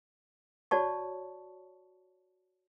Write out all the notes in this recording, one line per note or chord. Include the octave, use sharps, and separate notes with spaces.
F#4 C#5 D5 A5 C#6